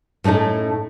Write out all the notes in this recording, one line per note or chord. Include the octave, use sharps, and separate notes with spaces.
A2 A3 C#4 D#4 A4